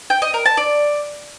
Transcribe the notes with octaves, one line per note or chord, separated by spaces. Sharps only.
G5
D#5
A#4
A5
D5